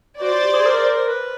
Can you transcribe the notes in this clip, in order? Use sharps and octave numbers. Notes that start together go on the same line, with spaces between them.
F#4 C5 D5
F4
G4
G#4
A#4
B4